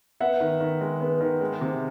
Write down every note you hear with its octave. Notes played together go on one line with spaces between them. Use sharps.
B3 E5 F#5
D#3
D#3
G#3
B3
D#3
G#3
C3